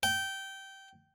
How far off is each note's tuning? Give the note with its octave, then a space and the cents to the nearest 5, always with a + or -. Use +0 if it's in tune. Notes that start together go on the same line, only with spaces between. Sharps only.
G5 -15